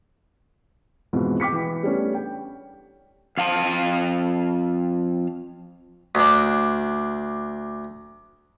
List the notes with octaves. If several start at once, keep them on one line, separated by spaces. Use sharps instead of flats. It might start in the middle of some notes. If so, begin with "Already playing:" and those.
F2 G#2 B2 E3 F3
G5 D6 B6 C#7
E3
G3 A3 B3 C#4 D4
G5
F2 F5 G#5 A5
D2 D4